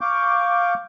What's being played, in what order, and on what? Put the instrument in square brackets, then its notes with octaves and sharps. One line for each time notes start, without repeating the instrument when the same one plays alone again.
[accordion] F5 C#6 D6 G6